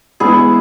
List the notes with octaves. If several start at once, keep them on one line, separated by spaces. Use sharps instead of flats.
E3 G#3 B3 E4 G#4